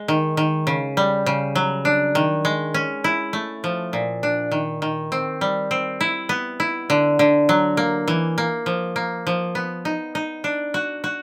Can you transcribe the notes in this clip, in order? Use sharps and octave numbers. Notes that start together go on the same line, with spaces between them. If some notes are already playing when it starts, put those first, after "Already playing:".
Already playing: G#3
D#3
D#3
C#3
G3
C#3
F#3
D4
D#3
G#3
C#4
E4
A3
F3
A#2
D4
D#3
D#3
C4
G3
C4
E4
B3
E4
D3
D3
F#3
A#3
E3
A#3
F3
A#3
F3
B3
D#4
D#4
D4
F#4
F#4